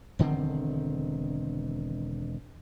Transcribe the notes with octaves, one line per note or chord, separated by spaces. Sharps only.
E1 D3 D#3 C4